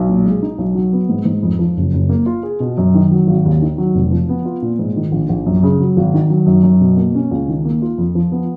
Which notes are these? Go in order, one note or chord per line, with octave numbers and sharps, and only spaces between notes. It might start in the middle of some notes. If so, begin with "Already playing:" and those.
Already playing: B1
A#2
G#3
D#4
B1
F#3
B3
G#2
G#2
F2
F3
F#1
F#1
A#3
F4
G#4
B2
F#2
D#3
F#3
G#1
D#2
D#3
F#3
F1
F3
B3
F4
A#2
G#2
D#3
A#1
A#1
F#2
C#3
F#3
G#1
D#3
F#3
F#2
F#2
B2
A#3
C#4
C#2
D#3
A#3
F4
F2
F3
B3